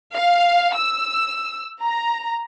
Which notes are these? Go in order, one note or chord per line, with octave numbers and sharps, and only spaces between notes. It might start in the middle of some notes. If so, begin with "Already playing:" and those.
F5
E6
A#5